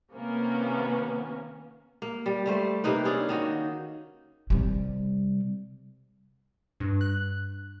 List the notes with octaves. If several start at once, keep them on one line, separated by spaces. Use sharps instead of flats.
C3 D#3 A#3 B3 C#4
A#3
G3
G3 A3 C5
C3 A#3 D#4 B4
C#4 D4 G#4
D#3 D#4 F#4
C3 G3
G2
F#6